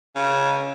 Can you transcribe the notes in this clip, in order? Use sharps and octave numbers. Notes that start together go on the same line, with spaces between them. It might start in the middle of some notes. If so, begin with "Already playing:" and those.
C#3